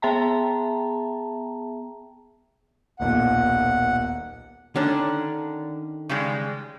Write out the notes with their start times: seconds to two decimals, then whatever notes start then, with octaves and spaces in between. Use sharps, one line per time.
0.02 B3 G#4 E5 G5 A5 A#5
3.00 D#1 B1 A#2 F#5
4.76 D3 D#3 C#4 D4
6.09 C#3 G3 G#3